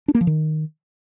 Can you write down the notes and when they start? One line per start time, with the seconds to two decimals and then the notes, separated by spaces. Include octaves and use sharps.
0.08 D4
0.15 A#3
0.21 F3
0.27 D#3